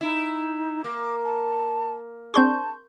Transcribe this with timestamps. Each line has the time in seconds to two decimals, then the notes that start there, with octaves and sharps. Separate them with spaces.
0.01 D#4 E4
0.84 A#3 D6
1.24 A5
2.34 C4 D4 G#4 A5 C6 C#6 G6